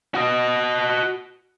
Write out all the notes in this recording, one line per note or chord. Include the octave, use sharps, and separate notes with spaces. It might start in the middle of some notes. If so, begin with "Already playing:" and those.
F#4 D#5